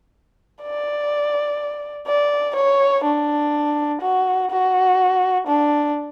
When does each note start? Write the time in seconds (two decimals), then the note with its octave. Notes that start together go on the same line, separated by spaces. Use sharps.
0.62 D5
2.07 D5
2.56 C#5
3.04 D4
4.01 F#4
4.51 F#4
5.47 D4